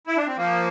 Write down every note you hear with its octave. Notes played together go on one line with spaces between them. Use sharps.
E4
D4
C4
F3 A#3